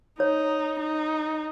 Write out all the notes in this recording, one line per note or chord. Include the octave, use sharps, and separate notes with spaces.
D#4 C#5
D#4